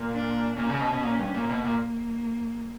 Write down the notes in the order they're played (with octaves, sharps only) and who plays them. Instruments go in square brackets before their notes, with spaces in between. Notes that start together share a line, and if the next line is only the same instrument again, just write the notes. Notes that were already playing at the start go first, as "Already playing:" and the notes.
Already playing: [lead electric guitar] A#2
[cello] D4
[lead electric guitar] A#2 [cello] C#4
[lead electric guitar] C#3
B2
B2
A#2
G2
A#2
[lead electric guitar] B2 [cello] A#3
[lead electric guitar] A#2